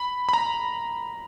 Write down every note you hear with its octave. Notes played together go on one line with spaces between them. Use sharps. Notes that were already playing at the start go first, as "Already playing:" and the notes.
Already playing: B5
B5
A#5